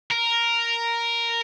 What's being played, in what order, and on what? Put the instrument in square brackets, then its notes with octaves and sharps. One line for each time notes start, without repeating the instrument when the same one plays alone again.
[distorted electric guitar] A#4